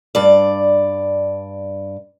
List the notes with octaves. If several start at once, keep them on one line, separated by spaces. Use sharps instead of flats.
G2 D5